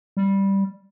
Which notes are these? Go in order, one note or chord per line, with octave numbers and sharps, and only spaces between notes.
G3